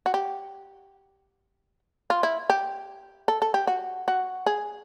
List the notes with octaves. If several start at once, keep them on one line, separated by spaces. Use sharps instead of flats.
F#4
G4
F4
E4
G4
A4
A4
G4
F#4
F#4
G#4